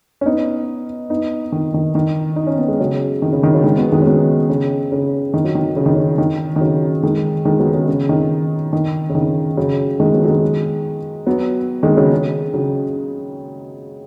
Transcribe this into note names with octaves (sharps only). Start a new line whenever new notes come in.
C#4
B3 D#4
B3 D#4
D#3
D#3
D#3
D#4
C#4
B3
G#3
C#3 F#3
D#3
C#3
D#3
C#3 F#3
D#3 G#3
F#3 B3
D#3 G#3
C#4
F#3 B3
C#3
C#3
D#3
F#3
D#3
C#3
D#3
C#3
D#3
D#3
C#3 F#3
D#3 G#3
D#3 G#3
F#3 B3
G#3 C#4
C#3
D#3
D#3
C#3
D#3
C#3 F#3
D#3 G#3
F#3 B3
F#3
D#3 G#3
F#3 B3
D#3 G#3
C#3 F#3
C#3
C#3 F#3